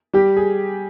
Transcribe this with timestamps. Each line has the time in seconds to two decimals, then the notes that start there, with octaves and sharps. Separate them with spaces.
0.13 G3 G4
0.37 G#4